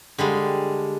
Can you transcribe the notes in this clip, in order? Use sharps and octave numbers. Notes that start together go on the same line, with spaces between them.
D3 G3 G#3 F5